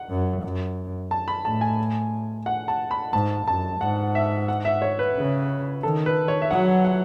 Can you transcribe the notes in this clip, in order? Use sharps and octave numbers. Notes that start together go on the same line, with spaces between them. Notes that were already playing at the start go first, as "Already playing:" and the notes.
Already playing: F#5
F#2
F#2
A5
B5
A2 A5
G#5
F#5
A5
B5
G#2 A5
F#2 A5
G#2 F#5
E5
F#5
E5
C#5
B4
C#3
D#3 A4
B4
C#5
E5
F#3 F#5
F#5